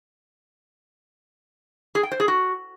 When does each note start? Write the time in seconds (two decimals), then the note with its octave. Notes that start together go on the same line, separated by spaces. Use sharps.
1.95 G#4
2.03 G5
2.12 C5
2.20 G#4
2.28 F#4